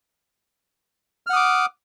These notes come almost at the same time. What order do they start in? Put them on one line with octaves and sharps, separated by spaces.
F6 F#5 D#6 D6